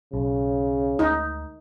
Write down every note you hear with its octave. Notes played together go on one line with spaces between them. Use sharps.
B1 C#3
D2 D#4